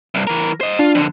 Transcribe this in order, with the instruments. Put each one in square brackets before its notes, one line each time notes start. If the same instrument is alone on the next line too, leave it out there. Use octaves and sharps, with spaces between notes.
[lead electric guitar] C2 G2
E3 A#4
C5 D#5
[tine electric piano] D4 [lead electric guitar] F4
[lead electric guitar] F2 D3